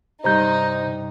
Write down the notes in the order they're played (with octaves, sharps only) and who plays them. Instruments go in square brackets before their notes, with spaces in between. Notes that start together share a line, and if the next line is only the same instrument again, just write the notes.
[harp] G2 C3 [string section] D#4 [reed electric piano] C5 A#5 G6